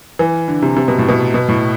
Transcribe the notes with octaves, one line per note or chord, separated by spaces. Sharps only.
E3
D3
C3
C3
B2
A2
B2
B2
A2